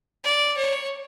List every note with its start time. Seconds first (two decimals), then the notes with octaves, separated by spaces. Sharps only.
0.24 D5
0.57 C#5